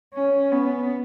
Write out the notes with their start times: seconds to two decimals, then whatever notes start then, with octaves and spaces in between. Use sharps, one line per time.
0.14 C#4
0.52 B3